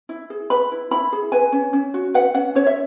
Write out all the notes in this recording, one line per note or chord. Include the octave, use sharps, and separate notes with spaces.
E4
G#4
B4 B5
E4
E4 B5
G#4
B4 G#5
C#4
C#4
F#4
B4 F#5
C#4 F#5
C#4 C#5
E5